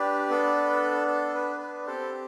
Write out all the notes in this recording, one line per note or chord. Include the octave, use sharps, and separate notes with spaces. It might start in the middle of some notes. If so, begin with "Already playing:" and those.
Already playing: D4 G4 B4 D5
B3 D4 A4
A4
B4
B4
C4 G4 A4 C5